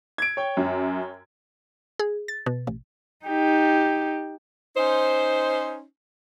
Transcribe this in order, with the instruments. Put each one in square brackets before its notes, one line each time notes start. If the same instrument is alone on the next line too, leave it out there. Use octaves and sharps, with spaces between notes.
[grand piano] G#6 D7
C#5 G5
[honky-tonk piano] F#2
[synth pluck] G#4
A6
B2
A1
[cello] D#4 G4
[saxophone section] C#4 D#4 C5